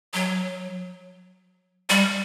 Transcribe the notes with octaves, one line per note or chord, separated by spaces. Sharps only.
F#3
G3